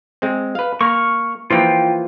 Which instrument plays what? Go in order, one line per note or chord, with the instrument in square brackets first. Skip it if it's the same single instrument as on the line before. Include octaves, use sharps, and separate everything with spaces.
[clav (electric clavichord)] G#3 C4
B4 F5
[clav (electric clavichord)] A#3 [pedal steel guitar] C#6 F6
[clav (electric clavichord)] E3 F3 A#3 [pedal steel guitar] F4 G5